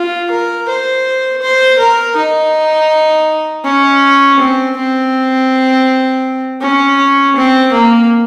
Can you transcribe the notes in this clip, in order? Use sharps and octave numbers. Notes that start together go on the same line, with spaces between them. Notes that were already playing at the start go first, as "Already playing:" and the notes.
Already playing: F4
A#4
C5
C5
A#4
D#4
C#4
C4
C4
C#4
C4
A#3